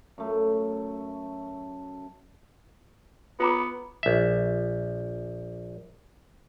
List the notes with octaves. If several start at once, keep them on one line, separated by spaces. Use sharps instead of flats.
F#2 A3
B3 F4 A#5 D6
A#1 E5